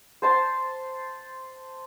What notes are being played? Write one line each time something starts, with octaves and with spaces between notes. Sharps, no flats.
C5 A5 C6